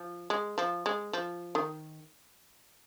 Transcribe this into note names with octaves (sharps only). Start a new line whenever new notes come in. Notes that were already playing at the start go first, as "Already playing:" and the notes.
Already playing: F3
G#3
F3
G#3
F3
D#3